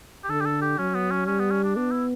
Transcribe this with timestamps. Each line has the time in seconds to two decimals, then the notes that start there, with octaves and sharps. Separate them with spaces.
0.24 G4
0.29 D3 A4
0.41 G4
0.46 A4
0.62 G4
0.78 F#3 C#4
0.95 B3
1.11 C#4
1.26 G3 C#4
1.40 B3
1.51 C#4
1.64 D4
1.75 B3 D4
1.92 E4